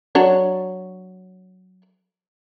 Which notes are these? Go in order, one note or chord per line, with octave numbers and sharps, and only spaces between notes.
F#3 D4 C#5